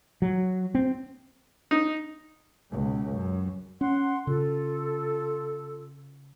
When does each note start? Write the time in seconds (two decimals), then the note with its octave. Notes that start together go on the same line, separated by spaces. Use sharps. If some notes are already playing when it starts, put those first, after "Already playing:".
0.22 F#3
0.75 C4
1.71 D#4
2.71 C#2 B2
3.12 F#2
3.81 C#4 F#5 C6
4.27 C#3 F4 A4